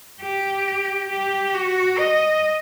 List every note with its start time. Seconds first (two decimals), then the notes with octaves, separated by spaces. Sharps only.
0.20 G4
1.09 G4
1.54 F#4
1.98 D#5